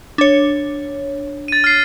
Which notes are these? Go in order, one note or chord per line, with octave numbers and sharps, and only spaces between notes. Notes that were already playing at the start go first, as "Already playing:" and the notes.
D4 C#5
A6 D#7
F6 C7